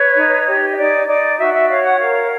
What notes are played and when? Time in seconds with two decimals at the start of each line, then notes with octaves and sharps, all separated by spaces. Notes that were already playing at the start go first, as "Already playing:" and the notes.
Already playing: B4 C#5
0.16 D#4
0.47 G4
0.73 D#5
0.77 D#4 D5
1.08 D#4 D5
1.38 F#4 E5
1.53 E5
1.68 C#5 F5
1.84 F#5
1.99 A#4 F5